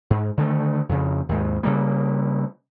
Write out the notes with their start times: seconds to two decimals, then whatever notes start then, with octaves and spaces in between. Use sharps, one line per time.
0.10 G#2
0.38 D3 D#3 A3
0.89 F2 C#3
1.29 D#2 G#2
1.63 C#3 G3 A#3